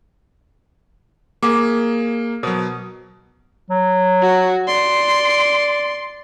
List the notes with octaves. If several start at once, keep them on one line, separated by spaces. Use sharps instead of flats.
A#3 G#4 F5 D6
B2 F#3 A#4 C5 D#6
F#3
F#4
D5 C6